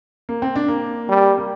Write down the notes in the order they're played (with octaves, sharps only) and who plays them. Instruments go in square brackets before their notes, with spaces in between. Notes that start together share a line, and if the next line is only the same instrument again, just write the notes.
[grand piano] A#3
C4
D4
A#3
[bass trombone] G3
[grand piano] A#3